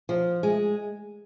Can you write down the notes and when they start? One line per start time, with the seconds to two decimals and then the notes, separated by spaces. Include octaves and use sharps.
0.09 F3
0.43 G#3